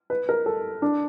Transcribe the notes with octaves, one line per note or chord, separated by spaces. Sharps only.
B4
A#4
A4
D4